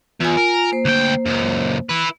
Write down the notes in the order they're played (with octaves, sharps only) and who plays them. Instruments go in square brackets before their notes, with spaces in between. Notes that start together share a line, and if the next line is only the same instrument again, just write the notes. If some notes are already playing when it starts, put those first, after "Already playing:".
[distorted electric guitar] E2 [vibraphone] F4 G#5
[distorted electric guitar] A#4
[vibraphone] A#3 C5
[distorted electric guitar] D2 G5
C#2 F#2
E4 B4